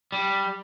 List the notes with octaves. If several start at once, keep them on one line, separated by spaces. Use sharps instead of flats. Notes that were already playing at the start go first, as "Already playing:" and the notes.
G3